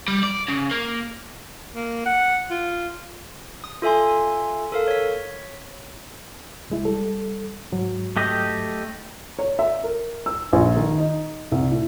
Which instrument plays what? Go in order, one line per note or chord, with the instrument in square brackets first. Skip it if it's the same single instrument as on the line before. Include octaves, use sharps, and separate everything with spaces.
[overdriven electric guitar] G3
D5
C#3
A#3
[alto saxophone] A#3
F#5
F4
[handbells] D#6
F4 A4 E5 G#5 C6
A4 A#4 F5
C#5 B6
[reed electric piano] C2 G#3 E4
G3 A4
G#2 F#3
[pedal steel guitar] A3 G4 D#5
[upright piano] C#5
E5
A#4
E6
A#1
D#3
D#4
C2
A2